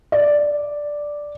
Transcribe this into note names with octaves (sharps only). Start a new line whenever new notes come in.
D5